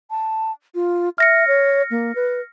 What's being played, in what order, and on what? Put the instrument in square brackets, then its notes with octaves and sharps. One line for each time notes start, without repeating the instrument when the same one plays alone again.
[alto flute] A5
F4
[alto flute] E5 [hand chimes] F6 A#6 C#7
[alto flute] C#5
A#3
B4